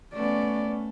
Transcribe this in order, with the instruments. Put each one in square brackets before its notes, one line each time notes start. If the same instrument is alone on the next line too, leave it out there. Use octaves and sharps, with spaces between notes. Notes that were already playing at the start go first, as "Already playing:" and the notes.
[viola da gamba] A3 [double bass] B3 C#4 [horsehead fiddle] D5